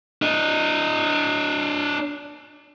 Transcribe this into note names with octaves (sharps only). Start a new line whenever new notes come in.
D4 D#5